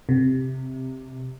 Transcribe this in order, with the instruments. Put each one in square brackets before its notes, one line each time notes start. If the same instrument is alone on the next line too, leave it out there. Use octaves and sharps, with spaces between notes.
[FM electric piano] C3